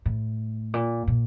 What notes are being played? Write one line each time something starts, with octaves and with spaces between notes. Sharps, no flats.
A2
A#2
A#2